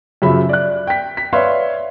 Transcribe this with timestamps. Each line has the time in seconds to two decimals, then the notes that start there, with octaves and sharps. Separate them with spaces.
0.22 F#2 C#3 F3 E5 B5
0.49 D5 F#6
0.87 G5 B6
1.17 B6
1.33 B4 C#5 D5 E5 F5 C6